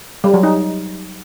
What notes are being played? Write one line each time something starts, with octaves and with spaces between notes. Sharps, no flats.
G3
F#3
D#4